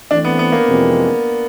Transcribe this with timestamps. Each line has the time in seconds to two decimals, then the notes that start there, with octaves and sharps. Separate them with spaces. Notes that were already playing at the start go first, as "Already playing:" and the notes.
0.11 E3 A3 C4 D4
0.25 B3
0.39 B3
0.52 A#3
0.66 F2 C3 E3 G#3 C4